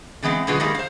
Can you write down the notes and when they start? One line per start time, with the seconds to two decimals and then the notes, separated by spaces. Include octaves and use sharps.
0.22 D3 E3 G#3 B3 C4
0.47 B2 D3 F#3 B3 F4 G#4
0.60 D#3 G3 G#3 A#3
0.75 C5 F5